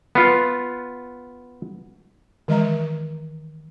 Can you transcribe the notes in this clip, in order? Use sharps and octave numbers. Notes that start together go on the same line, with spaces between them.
B3 F4
D#3 E3 G#3 D#5 E5 A#5